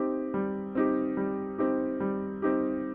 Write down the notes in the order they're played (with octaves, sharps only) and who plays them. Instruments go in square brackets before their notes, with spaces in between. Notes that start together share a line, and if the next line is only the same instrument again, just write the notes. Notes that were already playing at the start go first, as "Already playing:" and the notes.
Already playing: [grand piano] C4 D#4 G4
G3
C4 D#4 G4
G3
C4 D#4 G4
G3
C4 D#4 G4